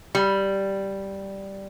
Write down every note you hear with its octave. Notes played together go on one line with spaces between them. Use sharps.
G3